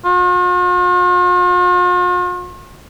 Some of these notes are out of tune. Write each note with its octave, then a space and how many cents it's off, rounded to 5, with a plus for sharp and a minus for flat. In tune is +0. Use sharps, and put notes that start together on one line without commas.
F4 +45